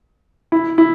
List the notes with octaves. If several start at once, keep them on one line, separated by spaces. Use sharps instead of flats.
E4
E4